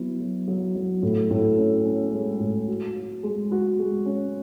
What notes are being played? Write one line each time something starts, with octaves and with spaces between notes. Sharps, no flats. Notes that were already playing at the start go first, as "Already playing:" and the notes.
Already playing: F#3 B3 E4
F#3
F#3
F#3
A2
A2
C#4
C#4
G#3
A2
F#4
F#4
G#3
F#4
G#3
C#4